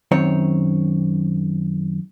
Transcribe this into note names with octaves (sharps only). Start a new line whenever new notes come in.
F#2 D#3 C4 C#5